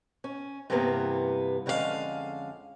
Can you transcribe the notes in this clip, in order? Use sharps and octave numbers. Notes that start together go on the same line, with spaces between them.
C#4
G2 C3 E3 A#3 B3
F2 D3 G#3 C#4 F4 F5